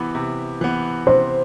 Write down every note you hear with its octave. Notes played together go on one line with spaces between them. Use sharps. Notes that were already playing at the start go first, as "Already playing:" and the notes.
Already playing: C3 E3 B3
C3
E3 B3
C3 C5